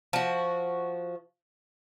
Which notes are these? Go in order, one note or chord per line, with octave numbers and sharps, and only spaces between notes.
F3 F#4